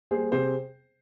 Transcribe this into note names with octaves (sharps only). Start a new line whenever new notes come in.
G3 A#3 G#4 C5
C3 G#4 C5